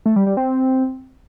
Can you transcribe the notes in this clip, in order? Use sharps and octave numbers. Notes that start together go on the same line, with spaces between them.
A3
G3
G3
C4